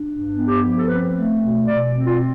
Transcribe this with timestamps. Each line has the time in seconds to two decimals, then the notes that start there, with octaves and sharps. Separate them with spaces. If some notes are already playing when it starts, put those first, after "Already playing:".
Already playing: D4
0.08 G2
0.35 B3
0.48 G4
0.62 F3
0.77 A4
0.88 C4 B4
1.15 A3
1.41 B2
1.67 B2 D5
1.93 C4
2.07 F4